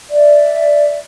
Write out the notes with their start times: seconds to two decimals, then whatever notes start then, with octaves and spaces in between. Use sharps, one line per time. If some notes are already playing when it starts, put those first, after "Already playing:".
0.10 D5 E5